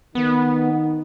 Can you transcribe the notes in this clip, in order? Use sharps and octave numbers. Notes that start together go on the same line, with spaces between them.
D#3 B3 D#4